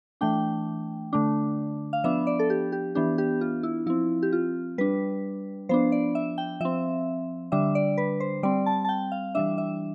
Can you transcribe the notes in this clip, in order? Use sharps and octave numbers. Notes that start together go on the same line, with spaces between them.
E3 A3 D4 G5
D3 A3 D4
F5
F3 B3 D4 E5
D5
A4
G4
G4
E3 B3 D4 G4
G4
F4
E4
F3 C4 E4
G4
F4
G3 D4 B4
F3 B3 D4 C5
D5
E5
G5
F3 C4 E5
D3 G3 D4 E5
D5
B4
C5
G3 C4 D5
A5
A5
G5
F5
E3 G3 D4 E5
E5